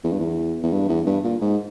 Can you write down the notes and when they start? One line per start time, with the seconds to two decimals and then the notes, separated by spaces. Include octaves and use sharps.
0.04 E2
0.13 G2
0.20 E2
0.63 E2
0.73 G2
0.89 E2
1.06 G2
1.24 A#2
1.41 G#2